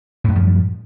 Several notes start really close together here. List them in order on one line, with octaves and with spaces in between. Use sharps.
A2 F#2 G3 F3